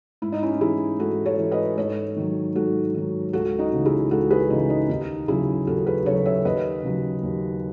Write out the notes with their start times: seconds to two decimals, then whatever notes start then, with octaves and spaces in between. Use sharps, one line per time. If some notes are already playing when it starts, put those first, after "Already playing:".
0.22 G#2 E4
0.32 D#4
0.43 C#4 E4
0.61 E3 E4 G#4
0.99 G#2 F#4 A4
1.26 A4 C#5
1.39 E3
1.51 B4 D#5
1.78 G#2 A4 C#5
2.17 D#3 F#3
2.55 G#2 F#4 A4
2.94 D#3 F#3
3.33 C#2 F#4 A4
3.59 D#4 F#4
3.72 C#3 E3
3.85 E4 G#4
4.11 C#2 F#4 A4
4.31 G#4 B4
4.50 C#3 D#4
4.54 E3
4.70 D#4
4.89 D#2 D#4
5.28 C#3 F#3 E4 G#4
5.67 D#2 F#4 A4
5.86 G#4 B4
6.06 C#3 F#3 A4 C#5
6.25 C#5 E5
6.45 D#2 B4 D#5
6.83 C#3 F#3
7.23 D#2